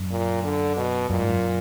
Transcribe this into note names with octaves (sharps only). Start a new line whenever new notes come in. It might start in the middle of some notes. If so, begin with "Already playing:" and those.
Already playing: F#2
A#2
D3
B2
F#2 A#2
G#2
F#2